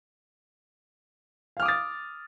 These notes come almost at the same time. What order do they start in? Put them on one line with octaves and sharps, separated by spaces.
F5 F6 D6 D#6 A6